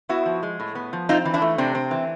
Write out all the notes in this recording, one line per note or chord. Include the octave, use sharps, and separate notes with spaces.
B3 E4 F#4
F3
G#3
A2
B3
F3
C4 D#4 F4
E3
D4 E4
A3
C3 C4 D4
C4
E3